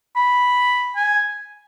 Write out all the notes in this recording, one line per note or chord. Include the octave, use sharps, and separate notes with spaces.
B5
G#5